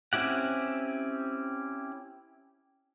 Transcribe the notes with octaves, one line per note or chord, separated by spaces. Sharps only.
C4 C#4 E4 G4 F#5